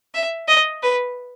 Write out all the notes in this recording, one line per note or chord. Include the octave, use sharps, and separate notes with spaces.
E5
D#5
B4